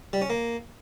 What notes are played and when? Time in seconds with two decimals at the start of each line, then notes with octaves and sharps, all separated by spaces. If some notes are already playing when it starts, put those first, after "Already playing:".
0.13 G3
0.22 C#4
0.30 A#3